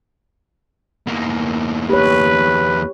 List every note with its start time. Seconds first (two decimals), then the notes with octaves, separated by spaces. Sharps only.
1.07 E2 A#3
1.89 G4 B4 C#5